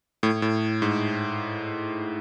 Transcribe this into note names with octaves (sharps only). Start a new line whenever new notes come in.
A2
A2
G#2